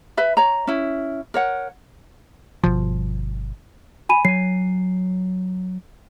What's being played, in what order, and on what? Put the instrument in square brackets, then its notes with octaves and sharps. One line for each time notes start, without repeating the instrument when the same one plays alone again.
[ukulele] B4 E5 B5
C#5 A#5
C#4 E4
A#4 C#5 F#5
[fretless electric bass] G1 B2 F3
[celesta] G#5 B5 D#7
[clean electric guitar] F#3 G#5 [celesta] C7